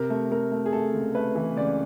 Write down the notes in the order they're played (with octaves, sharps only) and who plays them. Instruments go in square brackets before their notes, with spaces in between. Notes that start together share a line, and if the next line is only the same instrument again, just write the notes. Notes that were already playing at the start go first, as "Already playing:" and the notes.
Already playing: [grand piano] C3 A#4
A3
A3 A#4
A3
G#4
A3 A4
C#2
A3 B4
E3
C#2 D5